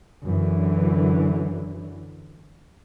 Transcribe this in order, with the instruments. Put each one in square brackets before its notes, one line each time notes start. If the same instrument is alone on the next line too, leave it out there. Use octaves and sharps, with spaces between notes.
[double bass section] F#2 D3 E3